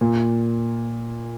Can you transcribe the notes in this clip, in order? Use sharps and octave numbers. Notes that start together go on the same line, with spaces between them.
A#2